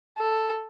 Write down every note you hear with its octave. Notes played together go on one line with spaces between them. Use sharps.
A4